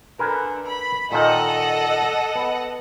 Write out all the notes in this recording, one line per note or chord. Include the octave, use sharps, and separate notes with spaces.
D3 A#4 B4 G#5
B5
A#2 D#3 A4 D#5 F#5
B3